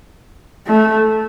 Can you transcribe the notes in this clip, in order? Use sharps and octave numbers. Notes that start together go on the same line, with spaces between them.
A3